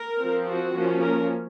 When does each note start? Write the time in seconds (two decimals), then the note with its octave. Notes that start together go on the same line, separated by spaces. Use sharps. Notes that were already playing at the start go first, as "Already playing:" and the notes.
Already playing: A#4
0.18 F3 C4
0.45 F#4
0.74 F3 A#3 C#4
1.01 A#4